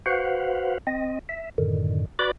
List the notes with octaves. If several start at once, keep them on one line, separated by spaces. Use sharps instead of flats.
F#4 B4 C5 F5 F#5
C4 D#5
E5
F#2 A2 D3 D#3
F#4 B4 D5 B5 D6